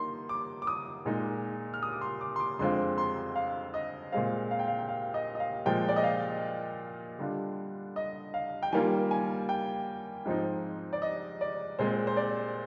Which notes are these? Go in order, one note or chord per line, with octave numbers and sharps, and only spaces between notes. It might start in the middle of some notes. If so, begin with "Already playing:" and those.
Already playing: D#3 A#3 D#4 C6
D6
D6
D#6
A#2 G#3 D#4
F6
D#6
D6
C6
D6
C6
D6
F2 D3 G#3 C4 F4 C6
C6
F5
D#5
A#2 G#3 C4 F5
F5
G5
F5
G5
F5
D#5
D#5
F5
A#2 F3 G#3 G5
D5
D#5
F5
D3 G3 D4 F4
D#5
F5
G5
D#3 G3 A#3 F4 G#5
G#5
G5
G#2 F3 C4 D#4
D5
D#5
D5
A#2 G#3 C4 C5
C5
D5